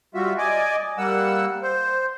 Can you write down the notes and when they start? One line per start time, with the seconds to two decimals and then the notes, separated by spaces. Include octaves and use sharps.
0.15 G3 F4 F#4 E5
0.38 D5 D#5 G#5 D6
0.98 G3 A#3 F#5 E6
1.62 C5